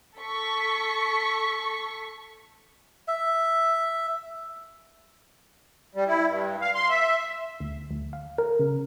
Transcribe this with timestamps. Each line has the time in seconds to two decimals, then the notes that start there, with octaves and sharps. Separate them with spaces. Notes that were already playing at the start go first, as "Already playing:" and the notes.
0.19 A4 C#6 B6
3.08 E5
5.95 G3
6.08 E4
6.28 G2
6.62 F5
6.75 C6
6.89 E5
7.60 D2
7.91 D2
8.13 F5
8.38 A#4
8.59 C#3